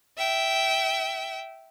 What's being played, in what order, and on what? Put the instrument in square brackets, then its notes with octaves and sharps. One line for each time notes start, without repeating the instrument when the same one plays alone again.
[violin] E5 G5